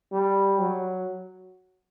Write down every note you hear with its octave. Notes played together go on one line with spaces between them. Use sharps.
G3
F#3